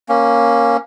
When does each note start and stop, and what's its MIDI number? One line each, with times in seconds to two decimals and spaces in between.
0.09 0.77 58
0.09 0.77 61